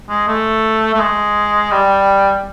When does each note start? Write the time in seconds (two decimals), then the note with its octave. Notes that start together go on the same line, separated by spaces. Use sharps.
0.09 G#3
0.28 A3
0.94 A3
1.00 G#3
1.72 G3